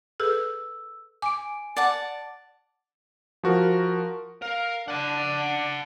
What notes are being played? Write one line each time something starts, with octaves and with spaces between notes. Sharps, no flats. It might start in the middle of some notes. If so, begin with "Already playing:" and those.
G#4 A4 B4 E6
G#5 D6 D7
D5 F#5 A5 A6
F3 F#4 A#4
A#4 F5
D4 F#5 A5